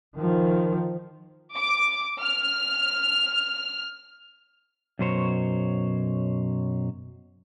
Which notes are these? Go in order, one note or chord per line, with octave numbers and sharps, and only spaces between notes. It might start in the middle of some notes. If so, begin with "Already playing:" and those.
D#3 F3
D6
F6
F#2 B2 F#3 C5 C#5